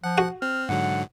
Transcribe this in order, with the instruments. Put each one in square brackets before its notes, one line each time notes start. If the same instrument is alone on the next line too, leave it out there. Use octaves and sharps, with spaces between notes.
[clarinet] F3 [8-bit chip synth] F#5
[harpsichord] F#4
[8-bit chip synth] C4 [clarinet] F6
[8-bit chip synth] G#2 D3 F#3 [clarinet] F#5